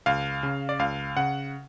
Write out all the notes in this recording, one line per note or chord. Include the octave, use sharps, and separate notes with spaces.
C#2 F5
C#3
D5
C#2 F5
C#3 F#5